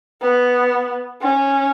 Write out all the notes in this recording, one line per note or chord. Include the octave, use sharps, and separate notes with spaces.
B3
C#4